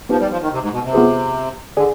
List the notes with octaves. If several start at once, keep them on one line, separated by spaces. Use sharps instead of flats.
F3 B3 D#4 G4 B4
G3
F3
D#3
C3
G#2
B2
C3
B3 F4 G#4 B4
D3 G#4 D5 G#5